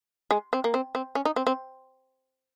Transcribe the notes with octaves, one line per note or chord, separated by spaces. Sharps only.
G#3
C4
A#3
C4
C4
C#4
D#4
C4
C4